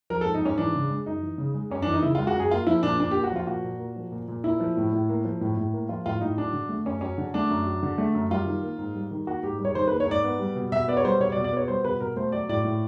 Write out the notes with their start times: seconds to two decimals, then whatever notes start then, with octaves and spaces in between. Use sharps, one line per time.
0.10 F3 A#4
0.21 A4
0.26 G#2
0.34 D#4
0.41 G#2 C#4
0.58 E3 D4
0.75 C#3
0.90 G#3
1.06 F#2 D#4
1.23 E3
1.38 C#3
1.54 G#3
1.70 F#2 C#4
1.82 E3 D4
1.93 D#4
2.03 C#3 E4
2.15 F4
2.19 G#3
2.27 F#4
2.35 F#2 G#4
2.51 A#3 F4
2.67 F3 E4
2.83 A#2 D4
3.00 A#2 D4
3.11 G4
3.16 A#3
3.24 F#4
3.32 F3 F4
3.47 A#2 F#4
3.64 A#2
3.79 A#3
3.96 F3
4.12 A#2
4.28 A#2
4.44 A#3 E4
4.60 F3
4.77 A2
4.93 A2
5.09 A#3
5.25 F3
5.41 A2
5.57 A2
5.73 A#3
5.89 F3 F4
6.06 A2 F4
6.21 A2 D#4
6.37 F#3 D4
6.53 D3
6.69 A3
6.85 F#2 C#4
7.01 F#3 C#4
7.18 D3
7.34 A3 D4
7.50 F#2
7.67 F#3
7.83 D3
7.98 A3
8.14 F#2
8.31 G3 F4
8.46 D#3
8.63 A#3
8.78 G#2
8.95 G3
9.11 D#3
9.27 A#3 F#4
9.43 G#2 G4
9.59 G3
9.65 C#5
9.75 D#3 C5
9.88 A#3 B4
10.00 C#5
10.07 G#2 D5
10.24 B3
10.39 G3
10.56 B2
10.72 B2 E5
10.88 B3 D5
10.97 C#5
11.05 G3 C5
11.20 B2 C#5
11.32 D5
11.36 B2
11.44 D5
11.53 B3 C#5
11.68 G3 C5
11.84 B2 B4
12.01 B2 A#4
12.16 A3 C5
12.32 F#3 D5
12.49 A2 D5
12.65 A2